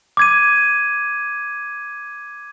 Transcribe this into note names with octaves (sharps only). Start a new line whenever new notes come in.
D6 G#6 D#7